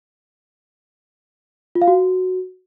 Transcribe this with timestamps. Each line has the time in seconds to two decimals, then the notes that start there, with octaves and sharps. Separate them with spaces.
1.75 F4
1.82 F5
1.88 F#4